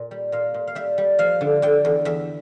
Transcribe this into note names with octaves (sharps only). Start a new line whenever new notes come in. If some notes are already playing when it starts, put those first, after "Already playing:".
Already playing: A#2
G3
A#2 F5
A#2
F5
G3 E5
G3
F3 F5
D3
D3 G5
E2
E2 E5